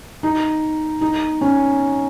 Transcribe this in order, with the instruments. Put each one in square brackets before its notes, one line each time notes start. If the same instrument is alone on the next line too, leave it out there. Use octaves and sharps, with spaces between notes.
[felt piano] D#4
D#4
C#4